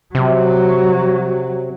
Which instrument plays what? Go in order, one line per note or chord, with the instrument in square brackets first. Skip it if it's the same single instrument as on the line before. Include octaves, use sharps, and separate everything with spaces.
[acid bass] C3 [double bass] F#3